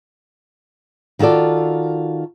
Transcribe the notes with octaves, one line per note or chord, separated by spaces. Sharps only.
D#3 F4 F#4 A4 D5